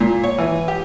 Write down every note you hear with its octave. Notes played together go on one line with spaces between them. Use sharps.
A#2
C#5
E3
G4